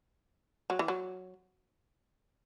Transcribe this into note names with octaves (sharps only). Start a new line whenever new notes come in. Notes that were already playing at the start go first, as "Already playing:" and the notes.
F#3
E3
F#3